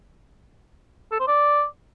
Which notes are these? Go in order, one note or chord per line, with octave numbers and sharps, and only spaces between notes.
A4
C5
D5